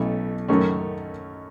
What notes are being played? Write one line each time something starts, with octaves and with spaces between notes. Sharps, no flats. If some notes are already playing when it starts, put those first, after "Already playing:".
Already playing: B1 B2 A3 C#4 E4
F#2 D#3 A3 C#4